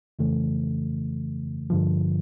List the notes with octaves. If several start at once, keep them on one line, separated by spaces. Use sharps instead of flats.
F2 C#3 E3 A3
G2 D3 F3